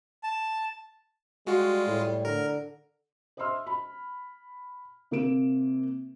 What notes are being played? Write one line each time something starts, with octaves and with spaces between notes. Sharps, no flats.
A5
G3 G#3 F4 F#4
A2
D3 A#4
C5 D#5 E5 C6 E6 F6
B5
C3 A#3 C4 A#4 D7 E7